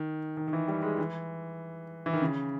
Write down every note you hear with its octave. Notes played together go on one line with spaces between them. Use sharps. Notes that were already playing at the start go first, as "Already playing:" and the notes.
Already playing: D#3
D#3
D#3
E3
G3
G#3
E3
E3
D#3
C#3